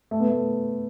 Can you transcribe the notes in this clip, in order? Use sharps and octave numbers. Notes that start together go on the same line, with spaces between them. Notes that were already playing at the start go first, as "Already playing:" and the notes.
A3
B3
A3